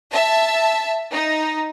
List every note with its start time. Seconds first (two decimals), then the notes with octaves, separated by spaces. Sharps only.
0.10 E5 A5
1.12 D#4